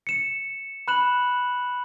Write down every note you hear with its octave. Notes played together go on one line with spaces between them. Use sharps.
C#7 E7
B5 F#6 E7 F#7